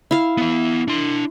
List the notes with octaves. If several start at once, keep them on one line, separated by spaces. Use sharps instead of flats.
E4 F5
B3 E5
D4 C6